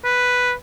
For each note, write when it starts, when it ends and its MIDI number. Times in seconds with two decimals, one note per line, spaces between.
0.05 0.53 71